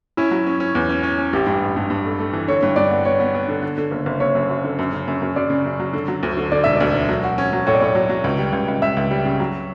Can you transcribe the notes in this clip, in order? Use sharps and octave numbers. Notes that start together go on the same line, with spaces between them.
C#4 E4
F#3
C#4
C#4
E2
C#4
C#4
C#4
A1 G4
G2
A1
G2
G2
A3
A3
E3
D3 C#5
G2
G2 D5
B3
B3 C#5
B3
B3
D3
D3
D3
F#1
F#1
F#1 C#5
F#2
F#2
D3
F#2
C#3
F#2
F#2
F#2 D5
C#3
F#2
F#3
D3
F#3
D2
D3
D3 D5
E1 E5
D2 D5
E1
F#3
F#4
C#4
F#3
A2 C#5
D5
A2 C#5
F#3
F#3
C#2
G3
C#2
C#2
C#2 E5
C#2
G3
C#3
F#3